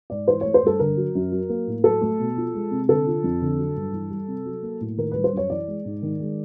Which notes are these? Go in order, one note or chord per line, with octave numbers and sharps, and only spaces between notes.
G#2 D5
E3 C5
A3 C#5
C5
G2 A4
D3 A#4
F#3
F#2
F#3
A#3
A2
F#3 A4
A3
B2
F3
G#3
C3
D3 A4
F3
F2
D3
F#3
G2
E3
G3
C3
F#3
A#3
A2
D#3 A#4
G3 B4
C5
F#2 C#5
E3 D5
G#3
G#2
D#3
G#3